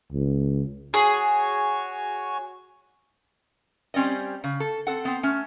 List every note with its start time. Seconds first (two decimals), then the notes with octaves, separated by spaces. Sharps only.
0.12 C#2
0.94 F#4 G#4 C#5 G#5
3.94 G3 C4 C#4 D5 D#5
4.44 C#3
4.60 A4
4.87 C4 A4 F#5
5.05 B3 C4
5.23 A3 C#4